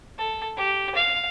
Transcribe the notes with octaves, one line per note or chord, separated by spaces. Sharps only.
A4
G4
F5